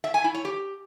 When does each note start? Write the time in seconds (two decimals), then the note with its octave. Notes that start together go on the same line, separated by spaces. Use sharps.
0.04 E5
0.14 G#5
0.24 E4
0.34 C#5
0.45 G4